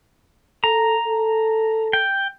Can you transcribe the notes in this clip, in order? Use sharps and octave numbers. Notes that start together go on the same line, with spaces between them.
A4 A#5
A4
G5